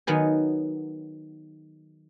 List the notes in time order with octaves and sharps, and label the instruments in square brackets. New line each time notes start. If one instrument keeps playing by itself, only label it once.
[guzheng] D#3 F#3 B3 G#4